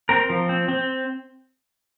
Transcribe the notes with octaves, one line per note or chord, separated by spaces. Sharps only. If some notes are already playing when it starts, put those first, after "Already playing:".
C4 A#4
F3
C4
C4